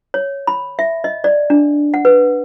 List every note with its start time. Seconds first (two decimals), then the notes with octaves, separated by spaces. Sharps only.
0.14 C#5
0.47 B5
0.79 E5
1.04 D#5
1.24 D5
1.50 D4
1.94 F#5
2.05 B4